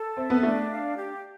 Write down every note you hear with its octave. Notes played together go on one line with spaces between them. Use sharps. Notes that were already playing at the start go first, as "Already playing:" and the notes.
Already playing: A4
C4 E5
B3
A3 D4
F5
G4